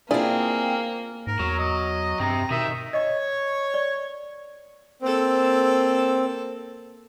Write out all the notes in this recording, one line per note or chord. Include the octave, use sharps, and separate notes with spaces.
A#3 C4 D4 E4 F4 G#4
G#2 A#4
E2 F#3
D#5
G2 C3 A#5
B2 D#3 E5
C#5 D#5
D5
A#3 C4 A4